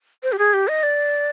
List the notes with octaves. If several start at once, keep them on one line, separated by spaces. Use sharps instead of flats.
C5
G4
G#4
G4
D#5
D5